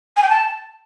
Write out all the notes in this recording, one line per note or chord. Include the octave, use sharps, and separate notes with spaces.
G#5
G5
A5